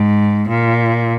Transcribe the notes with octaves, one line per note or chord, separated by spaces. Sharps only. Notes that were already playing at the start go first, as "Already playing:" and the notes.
Already playing: G#2
A#2